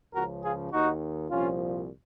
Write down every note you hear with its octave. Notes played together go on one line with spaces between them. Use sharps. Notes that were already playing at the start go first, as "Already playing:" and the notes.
C#2 C#3 F3 F#4 A#4
F4 G#4
D#2 D#3 D#4 F#4
C2 A#2 F3 C#4 F4